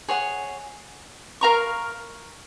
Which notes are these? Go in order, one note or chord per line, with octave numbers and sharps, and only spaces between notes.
G#4 C#5 F#5
A#4 F5 A#5 C#6